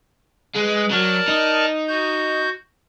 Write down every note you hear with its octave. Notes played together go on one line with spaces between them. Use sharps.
G#3 B4
F#3 A#4 D5 A5
D#4
F#4 G6